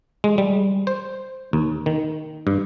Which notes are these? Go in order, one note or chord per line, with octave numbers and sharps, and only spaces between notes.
G#3
G3
C5
D#2
D#3
G2